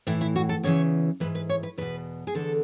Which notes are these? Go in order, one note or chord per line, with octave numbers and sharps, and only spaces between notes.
A2 E3 E4
E4
F#4
A4
E2 C#3 E3 C#5
G#2 E3 B4
B4
C#5
B4
E2 B2 B4
G#4
E2 D3 A4